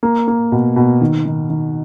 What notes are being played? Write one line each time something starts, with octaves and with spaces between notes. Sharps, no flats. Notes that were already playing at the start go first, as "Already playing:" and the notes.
A#3
A#3
B2
B2
D#3
D#3
D#3